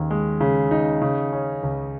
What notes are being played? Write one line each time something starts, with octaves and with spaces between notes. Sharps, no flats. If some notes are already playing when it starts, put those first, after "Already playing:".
Already playing: D#2 C#3 D#4
G#3
C#3
D#4
C#3
C#4
C#2